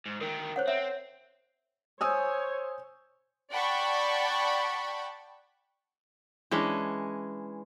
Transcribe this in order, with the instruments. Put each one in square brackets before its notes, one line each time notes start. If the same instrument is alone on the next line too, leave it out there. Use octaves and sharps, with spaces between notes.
[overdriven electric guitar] G#2
[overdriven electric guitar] D2 D#3 [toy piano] A#4
[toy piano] C5 C#5 F#5
[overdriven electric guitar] C4 [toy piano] E5
[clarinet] C5 [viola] C#5 [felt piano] G#5 D#6 E6
[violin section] D5 F#5 G5 A5 B5 C#6
[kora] E3 G#3 C#4 D4